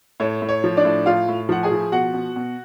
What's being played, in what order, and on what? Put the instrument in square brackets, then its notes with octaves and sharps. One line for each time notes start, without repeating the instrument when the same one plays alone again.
[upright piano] A2 C#5
A2
C#5
F3
D4 D5
A2
A2 F4 F5
A2
F3 F#5
G#4 G#5
F3
B2 F#4 F#5
B2
B2